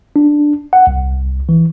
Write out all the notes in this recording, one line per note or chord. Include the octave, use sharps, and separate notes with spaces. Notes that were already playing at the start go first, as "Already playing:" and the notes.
D4
F#5
C2
E3